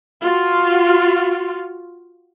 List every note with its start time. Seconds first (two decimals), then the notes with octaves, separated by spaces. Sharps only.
0.21 F4 F#4